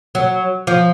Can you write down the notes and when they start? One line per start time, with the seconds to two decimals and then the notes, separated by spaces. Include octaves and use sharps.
0.15 F#3
0.67 F3